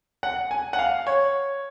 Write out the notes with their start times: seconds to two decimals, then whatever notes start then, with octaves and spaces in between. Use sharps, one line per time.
0.23 F#5
0.51 G#5
0.73 F#5
0.79 F5
1.07 C#5